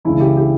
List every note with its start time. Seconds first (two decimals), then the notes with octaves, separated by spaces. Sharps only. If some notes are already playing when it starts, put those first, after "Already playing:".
0.05 C#2 C#3 E3 E4
0.20 G4
0.37 G4